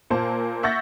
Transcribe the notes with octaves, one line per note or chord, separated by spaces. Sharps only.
A#2 A#3 C5 A5
E5 F#5 C#6 G6 A6 A#6